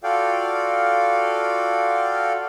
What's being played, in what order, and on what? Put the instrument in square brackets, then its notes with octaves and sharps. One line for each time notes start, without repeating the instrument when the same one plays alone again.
[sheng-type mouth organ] F4 F#4 A4 D5 F5 G5